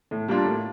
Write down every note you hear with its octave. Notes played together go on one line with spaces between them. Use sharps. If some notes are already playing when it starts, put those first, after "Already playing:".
A2
G3 A#3 D4 F4
A2